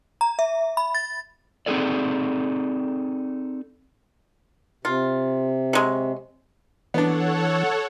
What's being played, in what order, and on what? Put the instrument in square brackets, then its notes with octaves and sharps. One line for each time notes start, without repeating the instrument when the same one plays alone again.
[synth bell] A#5
E5
B5
A6
[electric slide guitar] C4 D#4 E4 G#4 A4 D5
[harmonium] C3 [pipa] F4
[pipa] F#3 G#3
[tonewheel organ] E3 [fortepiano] B3 D4 [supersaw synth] A4 C#5 F#5